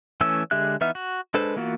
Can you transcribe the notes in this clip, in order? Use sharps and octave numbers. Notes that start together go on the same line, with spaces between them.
E3 A3 C#4 E6
D3 G#3 G4 E5 F#6
E3 B3 D#4 E5 F6
F#4
G#3 D4 A4 B4 C5
E3 A#3 B3 F4 F#4